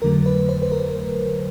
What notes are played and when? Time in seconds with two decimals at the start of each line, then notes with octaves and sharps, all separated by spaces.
0.02 F2 D3 F#3 A3 A#4
0.26 B4
0.49 C5
0.62 B4
0.72 A#4